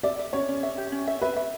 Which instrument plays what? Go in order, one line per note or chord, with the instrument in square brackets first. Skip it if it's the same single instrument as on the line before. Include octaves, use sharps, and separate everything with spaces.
[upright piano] D5 [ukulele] E5
[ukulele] E5
[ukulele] C#4 [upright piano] C#5
[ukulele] C#4
E5
G4
C#4
E5
[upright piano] B4 [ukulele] E5
[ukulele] E5